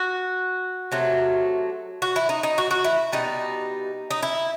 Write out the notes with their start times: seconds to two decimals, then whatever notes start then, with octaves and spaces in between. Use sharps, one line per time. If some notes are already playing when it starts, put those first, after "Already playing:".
Already playing: F#4
0.92 C3 F#3 A3
2.02 F#4
2.16 E4
2.29 D#4
2.43 D#4
2.58 F#4
2.71 F#4
2.84 E4
3.12 B2 G3 D#4
4.11 D#4
4.23 E4